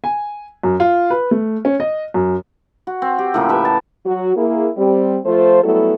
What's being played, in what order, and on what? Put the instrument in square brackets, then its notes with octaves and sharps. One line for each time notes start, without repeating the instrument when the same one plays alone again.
[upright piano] G#5
F#2
F4
B4
A3
C#4
D#5
F#2
[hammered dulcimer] F#4
C4
G4
A2 C#3 F3 A#3
G4 A4 B4 E5
A5
[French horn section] F#3 F#4
A#3 E4 G#4
G3 C4 G4
F3 A3 F4 C5
F#3 G3 A3 B3 E4 A4